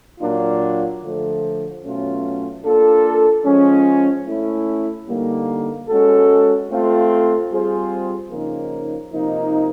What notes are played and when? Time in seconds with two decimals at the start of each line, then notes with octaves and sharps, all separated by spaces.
0.20 A#2 F#3 A#3 D4 F4
1.02 D3 F3 A3
1.83 B2 F#3 A3 C#4 F4
2.64 A#3 D4 F4 A4
3.44 F3 G#3 C#4
4.26 A3 C#4 E4
5.07 D3 G3 A#3 D#4
5.88 G#3 C#4 F#4 A4
6.70 A3 C4 F4
7.50 G3 C4 F4 G#4 C5
8.31 C#3 F3 A#3 D#4
9.12 C3 F3 A#3 D#4